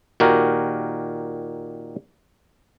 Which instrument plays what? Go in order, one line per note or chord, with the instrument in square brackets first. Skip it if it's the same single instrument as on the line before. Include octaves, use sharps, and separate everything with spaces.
[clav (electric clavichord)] A#2 D#3 F#4 G4 A#4